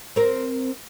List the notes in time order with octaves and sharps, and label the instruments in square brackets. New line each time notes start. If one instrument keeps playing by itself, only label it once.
[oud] C4 A#4